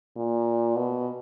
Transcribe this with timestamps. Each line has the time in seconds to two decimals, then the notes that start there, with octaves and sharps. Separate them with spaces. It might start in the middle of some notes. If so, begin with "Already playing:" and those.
0.16 A#2
0.76 B2